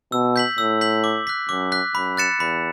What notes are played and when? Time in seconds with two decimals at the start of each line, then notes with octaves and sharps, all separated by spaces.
0.12 B2 E6
0.36 G6 B6 F#7
0.58 A2 E6
0.81 G6 B6 F#7
1.04 D6
1.27 F#6 B6
1.49 F#2 D6
1.72 F#6 B6
1.95 F#2 B5
2.17 F#6 A6 C#7 E7
2.40 E2 B5